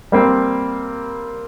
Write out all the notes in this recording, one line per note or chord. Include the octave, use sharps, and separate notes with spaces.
G3 A#3 C4